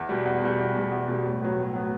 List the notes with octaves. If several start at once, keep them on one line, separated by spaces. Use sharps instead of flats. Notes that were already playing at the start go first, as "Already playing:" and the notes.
Already playing: E2
B2 G3
E2
B2 G3
E2
B2 G3
E2
B2 G3
A2
F#3 B3
A2
F#3 B3